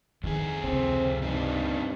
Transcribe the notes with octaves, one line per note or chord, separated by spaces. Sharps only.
F2 D#3 G#4
C#2 C3 C4
G2 C4 D4 D#4